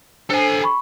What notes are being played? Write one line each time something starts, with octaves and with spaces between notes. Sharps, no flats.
D4 A4 C5 G#5
B5 C#6